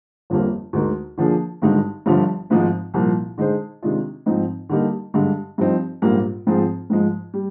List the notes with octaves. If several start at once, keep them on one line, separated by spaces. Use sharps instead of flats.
G1 F2 D3 G3 A#3
D2 D3 G#3 D#4 A#4
D3 F3 A#3 D4 G#4
G#1 G2 D3 G#3 D#4
G1 G2 D3 F3
G#1 G#2 F3 G#3 C4
C2 A#2 F3 A#3
D3 G#3 D#4 G#4 C5
C3 D#3 G#3 D4 F4
G#2 F3 C4 D#4
D3 G3 A#3 D#4
G2 D3 G#3
G2 F3 C4 D#4
A#1 G#2 G3 A#3
G#2 F3 C4 F4 G#4
G#2 F3 G#3
G3